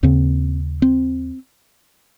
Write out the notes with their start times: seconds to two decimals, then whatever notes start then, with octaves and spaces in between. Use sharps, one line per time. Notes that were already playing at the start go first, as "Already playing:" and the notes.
0.03 D#2 C#3 C4
0.82 C4